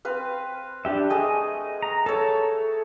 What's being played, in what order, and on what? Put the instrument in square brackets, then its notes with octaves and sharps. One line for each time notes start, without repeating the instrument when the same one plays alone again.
[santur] C4 B4 F5
[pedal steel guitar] D4 G4 E5
[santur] A3 G#4 [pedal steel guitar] D#5
[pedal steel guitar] A#5
[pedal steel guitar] A4 [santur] C#5 E5